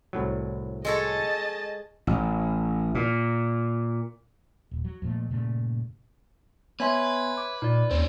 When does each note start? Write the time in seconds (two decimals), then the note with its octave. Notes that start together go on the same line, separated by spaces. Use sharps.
0.13 C2 A2 F#3
0.85 G#3 A4 C#5 D#5 A5
2.07 A1
2.95 A#2
4.71 D#1
4.85 F#3
5.02 F2 A#2 A3
5.30 G2 A#2 C#3 A3
6.80 B3 B4 C#5 E5 G#5 C6 G#6
7.37 D6
7.62 A#2 D#4 D5
7.91 D#2 C4 C#4 C5